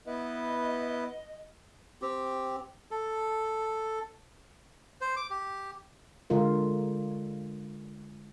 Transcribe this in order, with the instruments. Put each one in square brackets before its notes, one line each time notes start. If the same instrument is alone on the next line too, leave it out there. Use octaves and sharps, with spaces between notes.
[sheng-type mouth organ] B3 E4 B4 [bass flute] D#5
[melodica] C4 G4
A4
C5
D6
G4
[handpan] D3 G#3 F4 A#4